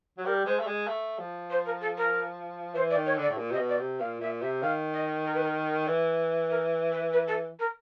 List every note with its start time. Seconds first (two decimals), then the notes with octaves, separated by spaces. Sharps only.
0.18 F#3
0.25 G3 A#4
0.45 G#3 C5
0.60 A3
0.67 G#3
0.88 A3
1.19 F3
1.50 C5
1.66 A#4
1.81 A4
1.97 A#4
2.74 E3 C5
2.90 D5
2.95 D#3
3.06 C#5
3.17 D3 D5
3.30 A2
3.37 A#2
3.51 C3 D#5
3.58 B2
3.69 D5
3.79 C3
4.00 A#2 F5
4.20 A#2 E5
4.41 C3 E5
4.62 D#3 F5
4.93 D#5
5.25 A#4
5.34 B4
5.43 A#4
5.87 E3
6.50 A#4
6.92 B4
7.12 B4
7.27 A4
7.59 A#4